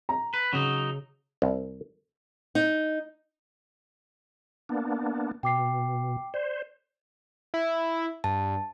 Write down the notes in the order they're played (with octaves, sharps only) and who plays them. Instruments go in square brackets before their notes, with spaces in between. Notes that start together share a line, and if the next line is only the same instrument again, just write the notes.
[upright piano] A#5
[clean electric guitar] B4
[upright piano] C#3 [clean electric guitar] F#3 D#4
[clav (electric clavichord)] C2
[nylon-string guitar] D#4
[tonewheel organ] A#3 B3 D4
[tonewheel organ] B2 [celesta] G5 D6 C7
[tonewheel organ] C5 [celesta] D5
[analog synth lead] E4
[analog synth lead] G2 [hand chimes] A5